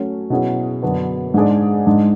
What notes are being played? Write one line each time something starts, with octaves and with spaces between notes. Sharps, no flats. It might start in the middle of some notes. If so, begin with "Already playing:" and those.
Already playing: F#3 A3 C#4
B2 F#3 C#4 E4 G#4
F#2 D3 F#3 B3 D4
G#2 G#3 D4 G#4 D5
G#2 G#3 D4